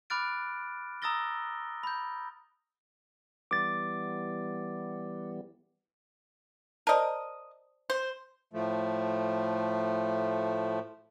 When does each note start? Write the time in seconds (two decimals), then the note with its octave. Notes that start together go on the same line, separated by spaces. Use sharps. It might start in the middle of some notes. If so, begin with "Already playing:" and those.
0.10 B5 D6 F6 F#6 A6 D7
1.02 A#5 D#6 E6 A6 A#6 G7
1.83 B5 G6
3.51 E3 G3 B3 D6 A6
6.87 A#4 C5 D5 D#5 A5
7.90 C5
8.53 A2 F3 A3